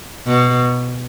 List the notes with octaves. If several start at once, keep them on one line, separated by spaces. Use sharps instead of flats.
B2